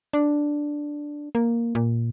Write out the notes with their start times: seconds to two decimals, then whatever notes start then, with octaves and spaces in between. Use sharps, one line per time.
0.13 D4
1.35 A#3
1.75 A#2